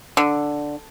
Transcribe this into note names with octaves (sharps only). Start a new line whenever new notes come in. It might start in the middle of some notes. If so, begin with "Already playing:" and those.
D3